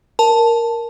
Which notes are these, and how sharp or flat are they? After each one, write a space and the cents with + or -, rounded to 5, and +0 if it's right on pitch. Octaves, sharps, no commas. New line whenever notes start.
A#4 +0 A5 +0